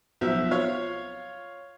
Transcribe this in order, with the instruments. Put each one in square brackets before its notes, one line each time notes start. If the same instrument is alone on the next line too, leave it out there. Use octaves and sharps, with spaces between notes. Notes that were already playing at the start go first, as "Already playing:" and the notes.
[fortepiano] B1 F3 E5
F4 C#5 F5